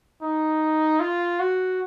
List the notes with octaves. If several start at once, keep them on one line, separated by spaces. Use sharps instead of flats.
D#4
F4
F#4